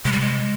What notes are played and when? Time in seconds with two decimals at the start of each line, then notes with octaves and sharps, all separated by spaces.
0.05 C3 G#3
0.12 G3
0.20 G#3